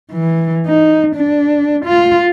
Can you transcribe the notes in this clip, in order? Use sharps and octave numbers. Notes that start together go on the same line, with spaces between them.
E3
D#4
D4
F4